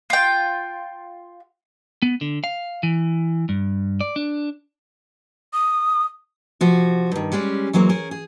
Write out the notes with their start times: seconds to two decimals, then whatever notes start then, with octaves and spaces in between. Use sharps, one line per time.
0.10 F4 G5
2.02 B3
2.21 D3
2.44 F5
2.83 E3
3.49 G2
4.01 D5
4.16 D4
5.53 D#6
6.61 C3 F3 F#4
7.12 G2 D#3
7.32 G3 G#3 C#4 G#4 D5
7.73 E3 F#3 G#3 A#3 C4
7.89 C#4 G#4 A#4
8.11 G#4